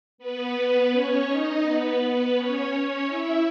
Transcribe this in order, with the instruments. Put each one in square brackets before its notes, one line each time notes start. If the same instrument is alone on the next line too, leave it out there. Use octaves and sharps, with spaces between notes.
[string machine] B3 B4
C#4 C#5
D#4 D#5
B3 B4
B3 B4
C#4 C#5
C#4 C#5
E4 E5